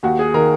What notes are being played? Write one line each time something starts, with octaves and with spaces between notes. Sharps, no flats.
D#2 F#4
G#4
D#3 A#4